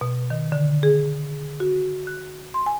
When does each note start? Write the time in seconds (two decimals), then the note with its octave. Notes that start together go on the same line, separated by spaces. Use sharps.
0.01 B2
0.30 D#3
0.52 D3
0.83 G#4
1.60 F#4
2.07 F#6
2.54 C6
2.66 G#5